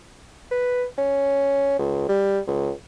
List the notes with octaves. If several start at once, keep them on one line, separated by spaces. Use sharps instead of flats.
B4
C#4
C#2
G3
C#2